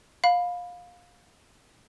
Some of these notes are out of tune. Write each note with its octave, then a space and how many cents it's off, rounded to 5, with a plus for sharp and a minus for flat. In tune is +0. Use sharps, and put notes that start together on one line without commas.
F5 +20 B5 +0